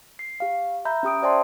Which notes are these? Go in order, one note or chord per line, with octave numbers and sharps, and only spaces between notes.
C7
G4 F5
E5 A#5 B5 G6
C#4 G4 D#6 D7
C5 D5 E5 G5 A5 C6